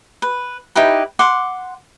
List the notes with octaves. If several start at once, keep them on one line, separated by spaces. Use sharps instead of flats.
B4
D#4 E4 G4 B4
F#5 C6 D6